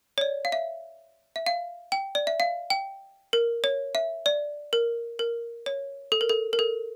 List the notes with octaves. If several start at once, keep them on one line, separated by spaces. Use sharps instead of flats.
C#5
D5
F5
E5
E5
F5
G5
D5
E5
F5
G5
A#4
C#5
E5
D5
A#4
A#4
C#5
A4
A#4
A4
A#4
A4